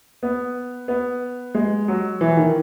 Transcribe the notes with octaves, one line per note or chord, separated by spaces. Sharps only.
B3
B3
G#3
F#3
E3
D#3